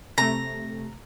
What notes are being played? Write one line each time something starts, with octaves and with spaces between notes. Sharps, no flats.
C3 A3 A#5